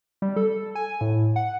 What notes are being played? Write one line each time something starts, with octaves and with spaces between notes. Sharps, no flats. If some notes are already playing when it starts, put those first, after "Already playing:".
G3
A4
G#5
A2
F#5